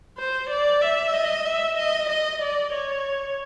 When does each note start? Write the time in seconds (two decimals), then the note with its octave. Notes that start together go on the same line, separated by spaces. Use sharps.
0.18 C5
0.50 D5
0.82 E5
1.14 D#5
1.45 E5
1.78 D#5
2.10 D#5
2.42 D5
2.73 C#5